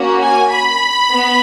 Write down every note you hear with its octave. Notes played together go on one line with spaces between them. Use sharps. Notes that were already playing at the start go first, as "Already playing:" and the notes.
Already playing: A#3 C#4 F#4
G#5
B5
B3